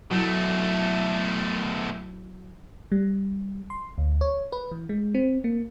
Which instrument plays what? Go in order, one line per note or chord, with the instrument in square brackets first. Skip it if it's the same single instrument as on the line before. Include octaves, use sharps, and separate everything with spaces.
[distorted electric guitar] B2 A3 [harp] F#3 E4
[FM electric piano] G3
C6
D2
C#5
B4
E3
G#3
C4
A#3